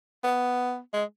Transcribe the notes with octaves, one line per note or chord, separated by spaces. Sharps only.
B3
G#3